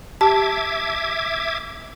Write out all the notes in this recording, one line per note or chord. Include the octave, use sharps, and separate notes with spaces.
G4 E5 A5 D6 G#6